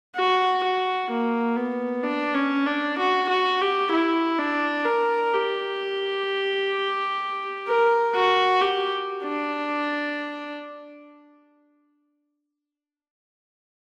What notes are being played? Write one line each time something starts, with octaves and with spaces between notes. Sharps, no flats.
F#4
F#4
A#3
B3
D4
C#4
D4
F#4
F#4
G4
E4
D4
A#4
G4
A#4
F#4
G4
D4